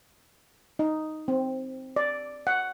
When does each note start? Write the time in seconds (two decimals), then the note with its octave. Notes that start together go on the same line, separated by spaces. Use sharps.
0.79 D#4
1.28 C4
1.96 D5
2.47 F#5